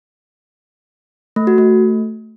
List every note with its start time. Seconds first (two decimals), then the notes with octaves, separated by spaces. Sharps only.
1.36 A3
1.47 F#4
1.58 A3